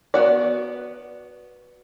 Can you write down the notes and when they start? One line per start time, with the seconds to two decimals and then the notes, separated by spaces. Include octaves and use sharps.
0.14 B3 F#4 D5